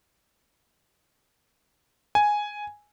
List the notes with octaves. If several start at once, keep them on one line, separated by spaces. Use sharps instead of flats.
G#5